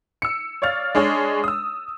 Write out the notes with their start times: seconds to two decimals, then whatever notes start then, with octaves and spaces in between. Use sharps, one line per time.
0.22 E6 C#7
0.62 C#5 D5 F5 F6 A6
0.95 G#3 D4 G#4 C#5
1.44 D#6 E6